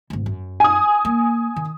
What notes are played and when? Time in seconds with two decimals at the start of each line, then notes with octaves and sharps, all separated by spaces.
0.10 G#1 D2
0.26 F#2
0.60 G#5 D#6
1.05 A#3
1.56 D#3